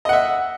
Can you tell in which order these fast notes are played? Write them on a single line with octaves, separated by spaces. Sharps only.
D#5 F#5 E5